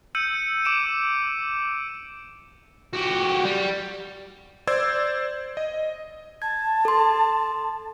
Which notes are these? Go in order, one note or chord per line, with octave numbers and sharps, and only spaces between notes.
E6 G6 C#7 D#7
D6 D7 E7
F#4 G4
G3
C5 D5 E6 G#6
D#5
A5 G#6
A4 C6